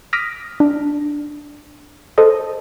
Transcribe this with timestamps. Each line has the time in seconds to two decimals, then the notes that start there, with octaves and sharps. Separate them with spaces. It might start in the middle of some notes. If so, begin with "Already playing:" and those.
0.13 D6 D#6 F6 A#6 B6
0.60 D4
2.18 A4 C5 D#5